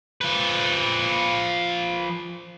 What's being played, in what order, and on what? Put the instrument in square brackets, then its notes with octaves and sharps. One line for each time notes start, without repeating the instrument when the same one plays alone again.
[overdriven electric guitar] F3 B4